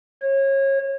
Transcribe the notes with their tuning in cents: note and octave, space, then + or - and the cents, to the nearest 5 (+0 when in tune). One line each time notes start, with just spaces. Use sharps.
C#5 -30